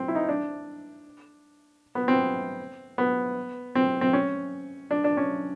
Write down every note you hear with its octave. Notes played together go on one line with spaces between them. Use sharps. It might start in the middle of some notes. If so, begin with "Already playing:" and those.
Already playing: C4
E4
D#4
D4
B3
C4
B3
C4
C4
C#4
D4
D4
C#4